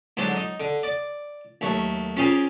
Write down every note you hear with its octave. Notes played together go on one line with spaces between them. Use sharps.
G#2 D3 F#3 C5 D5
D#4
D3
D5 D6
D#2 F#3 A3
C#4 F4 G4 G#4 A#4 C5